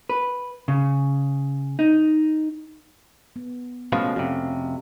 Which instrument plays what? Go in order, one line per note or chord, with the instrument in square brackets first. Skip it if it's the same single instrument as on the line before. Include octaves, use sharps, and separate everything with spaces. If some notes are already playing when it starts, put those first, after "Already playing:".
[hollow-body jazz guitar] B4
C#3
D#4
[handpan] B3
[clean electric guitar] B2 F3 G#3 [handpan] A3 C#4 F5
[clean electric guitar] F2 C3 [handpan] F#4